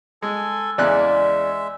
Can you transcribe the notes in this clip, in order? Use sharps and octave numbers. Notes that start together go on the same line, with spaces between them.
G#3 A4 G#5
E2 C#3 G#3 D5 E5 F#6